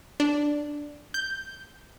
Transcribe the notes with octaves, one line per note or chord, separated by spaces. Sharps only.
D4
G6